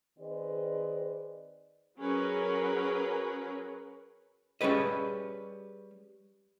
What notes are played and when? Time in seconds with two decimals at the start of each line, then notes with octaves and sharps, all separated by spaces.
0.19 D#3 C4 G#4 B4 D5 D#5
1.98 F#3 C#4 G#4 A#4 B4
4.61 G3 C#4 G#4 B4 D#5